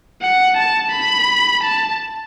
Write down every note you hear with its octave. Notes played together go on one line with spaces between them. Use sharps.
F#5
A5
B5
A5